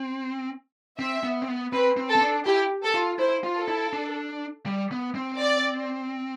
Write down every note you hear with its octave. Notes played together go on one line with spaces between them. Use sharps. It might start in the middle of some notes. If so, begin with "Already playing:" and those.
Already playing: C4
C4 E5
B3
C4
B3
C4 B4
C4
A4
C4
D4
E4 G4
A4
F4
E4 C5
F4
A4
E4
D4
G3
B3
C4
D5